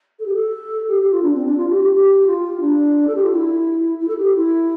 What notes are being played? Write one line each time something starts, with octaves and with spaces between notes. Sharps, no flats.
A4
G4
A4
G4
G4
F4
D4
C4
D4
F4
G4
G4
G4
F4
D4
A4
G4
F4
E4
E4
A4
G4
E4